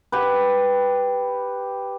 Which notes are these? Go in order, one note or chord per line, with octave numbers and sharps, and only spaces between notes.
G4 B4